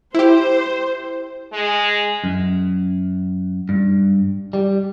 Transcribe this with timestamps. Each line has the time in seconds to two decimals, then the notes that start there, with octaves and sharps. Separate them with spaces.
0.15 E4 G4 C5
1.53 G#3
2.24 F#2
3.69 G2
4.53 G3